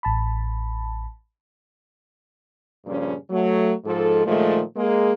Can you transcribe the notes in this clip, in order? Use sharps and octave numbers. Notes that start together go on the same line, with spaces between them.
A1 A5 B5
G2 A#2 C#3 F3 G3 C#4
F#3 A3
G#2 F3 A4
A#2 D#3 F3 G#3 A3
G#3 A#3 G#4